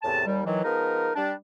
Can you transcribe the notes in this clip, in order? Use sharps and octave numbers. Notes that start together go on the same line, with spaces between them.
E2 A2 C3 A5
D#2 G3
D#3 E3 F#3
F3 G#3 B3 D#4 A#4
G3 D4